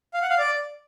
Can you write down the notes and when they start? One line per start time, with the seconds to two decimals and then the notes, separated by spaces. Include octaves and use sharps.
0.14 F5
0.22 F#5
0.30 F5
0.38 D5